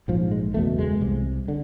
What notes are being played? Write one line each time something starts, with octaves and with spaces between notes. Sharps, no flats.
A#1 G#2 F3
G#3
F#1 E2 B2 A3
G#3
C2 C3
D3